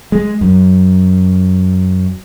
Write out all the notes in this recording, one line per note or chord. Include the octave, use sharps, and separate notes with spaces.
G#3
F#2